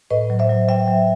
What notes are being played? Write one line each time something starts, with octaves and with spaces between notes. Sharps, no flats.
A2 B4 D#5
F#3
C5 E5
F#3
F#3 E5 G5
F#3